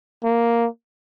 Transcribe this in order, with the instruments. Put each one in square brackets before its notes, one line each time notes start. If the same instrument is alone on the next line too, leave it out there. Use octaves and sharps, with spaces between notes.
[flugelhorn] A#3